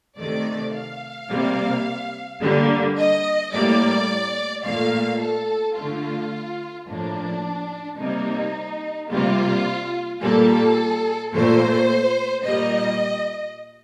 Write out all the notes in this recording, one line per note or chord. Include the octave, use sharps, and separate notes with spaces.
C3 D#3 A3 D5
F5
C3 G3 A#3
D3 G3 A#3
D#5
A2 G3 A#3 D5
A#2 A3 F5
A4
D3 A3 F4
A2 F3 A#3 D4
C3 G3 A#3 D#4
C3 G3 A#3 F4
A#2 G3 A#3 A4
A#2 A3 C5
A#2 G3 A#3 D#5